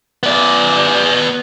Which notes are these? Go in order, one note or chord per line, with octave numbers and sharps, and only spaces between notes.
B3 D5